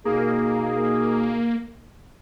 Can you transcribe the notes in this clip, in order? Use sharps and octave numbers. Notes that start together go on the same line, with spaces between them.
B2 A#3 D#4 G#4